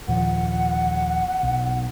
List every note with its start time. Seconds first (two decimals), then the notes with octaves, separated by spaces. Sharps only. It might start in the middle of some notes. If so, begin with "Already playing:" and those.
0.08 D#2 A#2 F3 F#5
1.43 B1